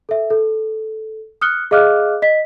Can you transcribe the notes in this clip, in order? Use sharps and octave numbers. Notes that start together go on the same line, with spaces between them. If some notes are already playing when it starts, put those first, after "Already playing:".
A4 E5
A4
D#6 F6 F#6 C#7 G7
G#4 D#5 F5 D6 F6 F#6
D#5 B6